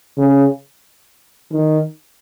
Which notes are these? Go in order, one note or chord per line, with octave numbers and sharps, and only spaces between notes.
C#3
D#3